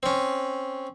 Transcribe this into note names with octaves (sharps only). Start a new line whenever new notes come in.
C4 C#4